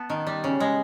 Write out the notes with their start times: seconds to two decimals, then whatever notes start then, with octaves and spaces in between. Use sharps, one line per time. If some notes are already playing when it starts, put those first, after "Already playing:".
Already playing: B3 A5
0.10 D#3
0.27 G3
0.44 C#3
0.60 G#3